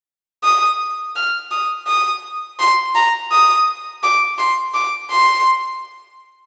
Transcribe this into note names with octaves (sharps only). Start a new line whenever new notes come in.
D#6
F6
D#6
D#6
C6
A#5
D#6
D6
C6
D6
C6